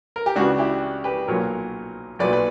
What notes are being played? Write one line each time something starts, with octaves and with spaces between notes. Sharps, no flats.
A#4
G4
C#2 C#3 E3 D4 F#4
E4 G4
G4 B4
B1 A#2 F#3 A#4 C#5
B1 A#2 F#3 B4 D5
B4